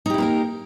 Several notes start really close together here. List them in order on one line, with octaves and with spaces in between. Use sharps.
D#4 G4 E4 A#3 A#4